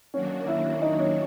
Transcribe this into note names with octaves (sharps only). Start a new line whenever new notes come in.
D#3 F#3 A#3 C#4 D4 F#4 C#5
E4 E5
D#4 D#5
C#4 C#5